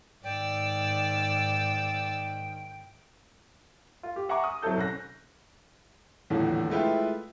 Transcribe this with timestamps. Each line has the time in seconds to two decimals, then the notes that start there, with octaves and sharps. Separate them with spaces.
0.24 G#2 D#3 D5 G5 E6
4.03 F4
4.16 G4
4.29 E5 F#5 G#5 A#5 C#6 D6
4.44 D#6
4.62 F#3 C4 E4 A4 G6
4.77 C2 C#4 F#6 A#6
6.30 D#1 E2 A2 D3
6.70 G#3 A3 E4 F4 B4 G5